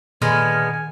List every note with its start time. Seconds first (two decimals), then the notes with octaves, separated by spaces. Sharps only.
0.22 A#2 D3 D#3 G#3 B3 G#5 F6